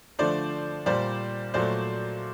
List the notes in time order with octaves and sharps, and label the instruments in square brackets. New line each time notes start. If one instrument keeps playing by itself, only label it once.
[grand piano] D3 F3 A3 C5 D5
A#2 G3 C5 D5
A#2 F#3 A3 C5 D5